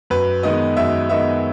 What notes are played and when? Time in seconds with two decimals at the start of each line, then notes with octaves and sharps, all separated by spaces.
0.10 F#2 B4
0.43 D#3 G#3 B3 D#5
0.76 F#2 E5
1.09 D#3 G#3 B3 E5